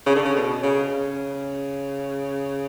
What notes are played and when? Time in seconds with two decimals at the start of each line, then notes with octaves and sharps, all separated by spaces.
0.06 C#3
0.15 D3
0.25 C#3
0.36 B2
0.63 C#3
0.92 C#3